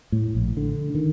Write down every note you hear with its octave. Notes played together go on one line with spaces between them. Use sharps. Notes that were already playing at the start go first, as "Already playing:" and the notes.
A2
A#1
D3
D#3